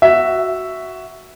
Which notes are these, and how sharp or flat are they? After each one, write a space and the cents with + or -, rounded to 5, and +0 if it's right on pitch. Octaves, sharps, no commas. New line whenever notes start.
F#4 +5 E5 +0